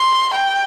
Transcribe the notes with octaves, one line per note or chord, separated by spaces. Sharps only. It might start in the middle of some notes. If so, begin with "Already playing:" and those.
Already playing: C6
G5